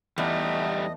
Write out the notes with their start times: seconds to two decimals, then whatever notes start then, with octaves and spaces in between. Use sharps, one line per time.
0.18 E2 G3 A3 B3 D#4 D#5